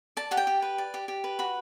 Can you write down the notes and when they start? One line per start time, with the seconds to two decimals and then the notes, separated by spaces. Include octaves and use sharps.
0.17 D5 A5
0.31 G4 F#5
0.37 G5
0.47 G4
0.62 B4
0.78 D5
0.94 G4
1.08 G4
1.24 B4
1.39 F#4 B5